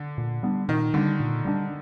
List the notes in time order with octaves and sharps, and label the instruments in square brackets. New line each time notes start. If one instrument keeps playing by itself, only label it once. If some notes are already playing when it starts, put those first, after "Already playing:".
Already playing: [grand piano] D3
[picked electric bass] A#2
G3 B3 D4
[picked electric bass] A#2 [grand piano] D#3
[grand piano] D3 [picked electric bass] G3 B3 D4
[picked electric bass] A#2
G3 B3 D4